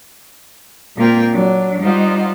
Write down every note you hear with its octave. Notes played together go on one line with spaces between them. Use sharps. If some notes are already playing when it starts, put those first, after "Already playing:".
A#2 A#3 C4 F4 A#4 G5
F#3 D4
G3 D#4 F4 C5 F#5